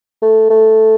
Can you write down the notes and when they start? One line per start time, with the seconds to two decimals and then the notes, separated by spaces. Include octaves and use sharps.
0.22 A3
0.50 A3